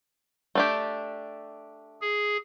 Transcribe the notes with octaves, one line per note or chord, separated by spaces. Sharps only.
A3 D4 G4
G#4